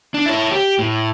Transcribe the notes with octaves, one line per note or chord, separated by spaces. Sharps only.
D4
E4 C#5
G4
A2